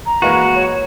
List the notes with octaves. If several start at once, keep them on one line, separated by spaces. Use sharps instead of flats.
A#5
E3 G#3 A#3 F#4
C#5